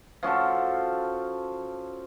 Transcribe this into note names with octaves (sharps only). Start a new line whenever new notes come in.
F3 C#4 F#4 A4